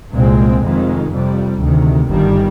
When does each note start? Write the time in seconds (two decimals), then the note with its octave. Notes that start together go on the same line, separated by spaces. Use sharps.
0.13 C2 A#2 G#3 C4
0.62 F1 F2 D#3 G#3
1.11 F2 C3 G3
1.60 D2 C3 D#3
2.09 G1 G2 D#3 G3